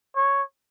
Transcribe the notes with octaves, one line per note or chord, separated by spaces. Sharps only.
C#5